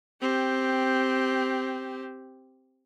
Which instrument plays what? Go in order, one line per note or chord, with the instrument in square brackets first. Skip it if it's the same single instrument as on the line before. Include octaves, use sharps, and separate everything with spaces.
[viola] C4 G4